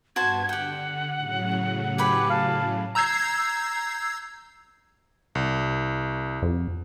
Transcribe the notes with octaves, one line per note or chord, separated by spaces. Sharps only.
G2 B3 F#4 C5 A5 G#6
D3 G4 F#5 G5
A2 C#3 F#3
G4 G#4 B4 B5
F5 A5
A#5 E6 G6 G#6 C7
C2
F2